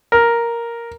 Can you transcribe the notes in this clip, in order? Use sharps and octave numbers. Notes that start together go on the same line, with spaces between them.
A#4